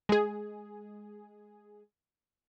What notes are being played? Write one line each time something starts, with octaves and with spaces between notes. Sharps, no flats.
G#3 G#4